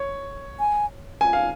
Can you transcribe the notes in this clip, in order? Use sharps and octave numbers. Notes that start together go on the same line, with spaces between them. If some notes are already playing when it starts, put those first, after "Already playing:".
Already playing: C#5
G#5
G#5
F5